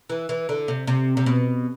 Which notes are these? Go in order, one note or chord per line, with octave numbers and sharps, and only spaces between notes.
E3
E3
D3
C3
C3
C3
B2